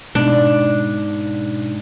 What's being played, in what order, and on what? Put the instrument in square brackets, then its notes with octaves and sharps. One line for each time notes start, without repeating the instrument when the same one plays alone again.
[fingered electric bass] G#2 [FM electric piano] B2 [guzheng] D4